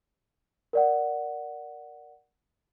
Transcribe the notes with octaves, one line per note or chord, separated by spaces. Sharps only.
A#4 D5 F#5